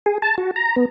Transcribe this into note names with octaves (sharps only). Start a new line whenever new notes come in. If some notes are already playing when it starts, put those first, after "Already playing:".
G#4
A5
F#4
A#5
B3